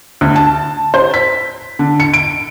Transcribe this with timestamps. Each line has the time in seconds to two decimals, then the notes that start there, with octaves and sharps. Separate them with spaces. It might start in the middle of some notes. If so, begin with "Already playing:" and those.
0.21 D2
0.36 A5
0.94 C5
1.14 B6
1.79 D3
2.00 C#7
2.14 D7